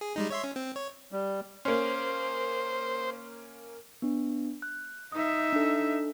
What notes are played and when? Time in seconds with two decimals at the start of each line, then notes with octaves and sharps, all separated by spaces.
0.01 G#4
0.16 G3 G#3 D#4
0.30 C#5 E5 C6
0.44 C#4
0.56 C4
0.76 C#5
1.12 G3
1.65 A#3 C#4 C5
4.02 B3 D4
4.62 F#6
5.12 D#4 E5 D#6
5.53 D4 A4